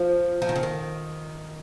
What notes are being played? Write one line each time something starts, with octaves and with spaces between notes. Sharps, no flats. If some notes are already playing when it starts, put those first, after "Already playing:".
Already playing: F3
F3
D#3
C#3
D#3